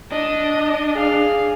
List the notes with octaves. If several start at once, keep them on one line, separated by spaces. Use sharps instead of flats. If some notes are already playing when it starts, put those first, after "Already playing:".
D4 D#5
G#4 F5